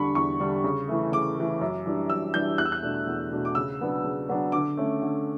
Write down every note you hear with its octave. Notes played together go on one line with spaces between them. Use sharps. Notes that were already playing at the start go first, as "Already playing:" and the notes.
Already playing: E2 D3 G3 D4 B5 C#6
E2 C#6
D3 G3 D4
C#3
E3 A3
C#3 D6
E3 A3
F#2
E3 G3 D4
F#2 E6
E3 G3 D4 G6
E2 F#6
E6
F#6
B2 A3 D4
E2
B2 A3 D4
D6
C#3 E6
F#3 B3 D4
C#3
F#3 B3 D4
D3 D6
A3 C#4
D3